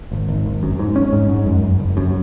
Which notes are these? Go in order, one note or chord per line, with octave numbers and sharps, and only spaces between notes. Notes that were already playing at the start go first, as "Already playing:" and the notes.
G#1
G#1
G#1
F#2
G#2
C#4
G#2
G#2
F#2
F#2
F#1
F#2